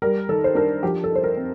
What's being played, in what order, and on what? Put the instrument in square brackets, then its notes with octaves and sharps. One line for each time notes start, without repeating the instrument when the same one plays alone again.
[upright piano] G3 A#4
D#3 A4
C5
D4 A#4
F3 G4
A4
D#4
C5
A#4
C4